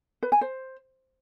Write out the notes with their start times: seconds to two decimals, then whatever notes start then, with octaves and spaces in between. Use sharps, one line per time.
0.23 B4
0.32 G#5
0.41 C5